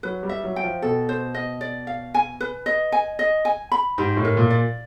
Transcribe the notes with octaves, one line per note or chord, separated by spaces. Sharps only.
F#3 B4
G3
E5
F#3
G5
F3
B2 A4
C5
D#5
D5
F5
G#5
B4
D#5
G#5
D#5
G#5
B5
G#2 G4
A2
A#4
A#2
D5